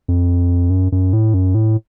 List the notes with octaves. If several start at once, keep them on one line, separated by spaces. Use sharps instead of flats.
F2
F#2
F#2
A2
F#2
A2